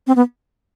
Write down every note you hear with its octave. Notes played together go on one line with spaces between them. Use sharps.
C4
B3